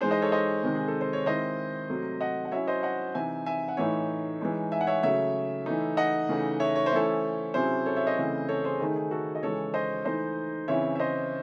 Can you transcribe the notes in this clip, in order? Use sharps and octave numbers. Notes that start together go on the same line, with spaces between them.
E3 G#3 D#4 G#4 C5
C5 D#5
A4 C#5
C5 D#5
C3 D#3 G#3
G#4
A4
C5
C#5
D#3 G#3 C4 E4 C5 D#5
C3 F#3 A3
D#5 F#5
F#5
F#3 C#4 E4 C#5 E5
C5 D#5
D#5 F#5
C3 E3 C4 D#4 E5 G#5
E5 G#5
F#5
A2 E3 A3 D#4 C#5 E5
E3 G#3 D#4
E5 G#5
F#5
C#5 E5
C#3 F#3 A3 C#5 E5
E3 A3 D#4
D#5 F#5
C#3 E3 A3 D#4
C#5 E5
C#5
C5
E3 A3 C#4 E4 A4 C#5
C3 F#3 C#4 E4 G#4 C5
A4 C#5
C#5 E5
C5 D#5
C#3 E3 A3 C4 E4
A4 C#5
G#4 C5
D#3 A3 D#4 G#4
G#4
F#4 A4
D#5
C#3 E3 G#3 A4 C#5
C5 D#5
E3 A3 D#4 C5 D#5
C#3 E3 C4 E4 C#5 E5
E5
C5 D#5